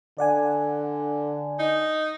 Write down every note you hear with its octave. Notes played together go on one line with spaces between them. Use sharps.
D3 D5 F#5 G#5
D#4